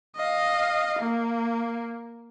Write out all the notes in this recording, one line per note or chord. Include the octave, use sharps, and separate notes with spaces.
D#5 F5
A#3